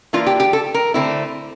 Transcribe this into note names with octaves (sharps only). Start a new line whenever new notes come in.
E3 A#3 D4 F4
G4
G4
A4
A#4
D3 A3 C4 E4